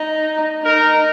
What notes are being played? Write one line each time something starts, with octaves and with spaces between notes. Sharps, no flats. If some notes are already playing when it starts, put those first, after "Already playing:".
Already playing: D#4
D#4 A#4